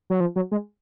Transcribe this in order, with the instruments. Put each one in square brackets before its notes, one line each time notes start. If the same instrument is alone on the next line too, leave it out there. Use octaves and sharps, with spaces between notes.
[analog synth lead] F#3
F3
F#3
G#3